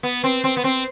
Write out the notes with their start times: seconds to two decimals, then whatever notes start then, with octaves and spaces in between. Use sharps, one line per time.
0.03 B3
0.24 C4
0.44 C4
0.57 B3
0.64 C4